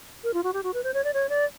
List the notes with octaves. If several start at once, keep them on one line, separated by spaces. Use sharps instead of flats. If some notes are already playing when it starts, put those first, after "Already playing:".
A#4
F4
F#4
G4
F#4
B4
C5
C#5
D5
C#5
D5